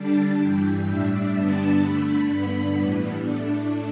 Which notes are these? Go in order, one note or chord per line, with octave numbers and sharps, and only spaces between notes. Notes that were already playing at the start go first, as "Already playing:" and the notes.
Already playing: D3 G3 D4 A5
G2 E3 G3 G5
A2 G3 D4 E5
G2 D3 G3 B3 D4 A5
D3 A3 D4 B5
G2 D3 B3 D4
A2 E3 G3 B3
A2 A3 D4